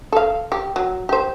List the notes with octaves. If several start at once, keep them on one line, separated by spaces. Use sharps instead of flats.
A4 F5
G4
F#3
G4 C5